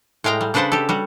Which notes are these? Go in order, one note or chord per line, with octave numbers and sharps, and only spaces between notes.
A2 G#3 F5 G5 A#5
G3
C#3 D4 B4 C5 F#5 A5
G4 A4
G3 F#4